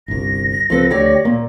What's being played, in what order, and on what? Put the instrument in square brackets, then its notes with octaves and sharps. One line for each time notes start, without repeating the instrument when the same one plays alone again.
[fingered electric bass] G1 C2 [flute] A#6
[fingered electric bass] C#2 F3 [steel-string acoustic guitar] C4 A4 B4
[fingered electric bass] D2 [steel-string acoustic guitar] G4 C#5 D5
[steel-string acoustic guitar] A#2 [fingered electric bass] A#3